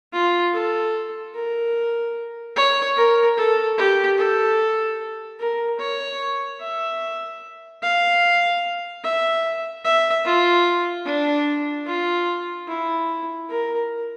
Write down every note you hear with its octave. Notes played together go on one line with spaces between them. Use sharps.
F4
A4
A#4
C#5
A#4
A4
G4
A4
A#4
C#5
E5
F5
E5
E5
F4
D4
F4
E4
A#4